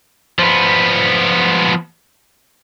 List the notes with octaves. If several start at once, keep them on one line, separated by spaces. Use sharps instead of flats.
F3 B3